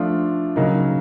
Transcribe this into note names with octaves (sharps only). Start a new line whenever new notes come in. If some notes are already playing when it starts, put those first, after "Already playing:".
Already playing: F3 A3 D4 F4
C#3 F#3 A#3 D#4